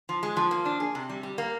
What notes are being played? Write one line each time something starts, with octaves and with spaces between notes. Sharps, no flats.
F3
G#3
F3
A#3
D4
G#4
C3
G3
G3
A#3